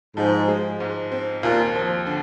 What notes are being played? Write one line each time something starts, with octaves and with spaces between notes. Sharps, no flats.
G#2 F3
G#3
G#2
C4
D#2 A#2
F3
D3